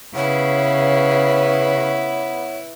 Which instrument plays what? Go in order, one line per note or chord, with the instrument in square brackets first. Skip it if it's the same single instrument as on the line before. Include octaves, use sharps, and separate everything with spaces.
[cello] C#3 [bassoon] B3 [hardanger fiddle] E4 B4 [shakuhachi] C#5